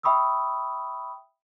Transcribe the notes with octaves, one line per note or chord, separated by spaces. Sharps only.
E5 G5 B5 C#6 D#6 E6